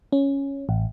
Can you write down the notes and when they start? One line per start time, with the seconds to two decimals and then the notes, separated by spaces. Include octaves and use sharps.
0.12 C#4
0.69 A1